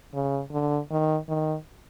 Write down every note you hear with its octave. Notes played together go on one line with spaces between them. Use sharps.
C#3
D3
D#3
D#3